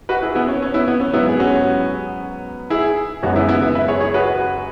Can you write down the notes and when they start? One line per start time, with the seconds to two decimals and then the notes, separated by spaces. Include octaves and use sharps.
0.09 F#4 B4
0.22 E4 G#4
0.35 B3 E4
0.48 C#4
0.62 C#4
0.74 B3 E4
0.88 B3
1.01 C#4
1.14 G#2 F#3 B3 E4
1.29 G#4
1.40 C#4 F#4
2.70 E4 G#4
3.23 F#2 C#3 G#3 B3 C#4 F#4
3.36 B3 E4
3.49 B3 E4
3.62 B3 E4
3.75 B4 E5
3.88 G#4 C#5
4.01 G#4 C#5
4.14 F#4 B4